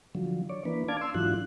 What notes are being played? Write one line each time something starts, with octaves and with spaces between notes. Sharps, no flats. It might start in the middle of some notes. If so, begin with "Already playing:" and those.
D3 F3 F#3
C#5 D5
E3 A#3 D4 B4
D4 D5 F5 A5 D6 G#6
C6 E6
G#2 E3 F#3 D4 F4 F#6